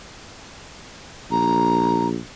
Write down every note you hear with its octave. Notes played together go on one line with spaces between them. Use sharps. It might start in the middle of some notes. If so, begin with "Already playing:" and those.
A#1 A#5